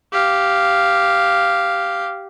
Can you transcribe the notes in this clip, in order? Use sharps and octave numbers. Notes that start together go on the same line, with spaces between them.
G4 F5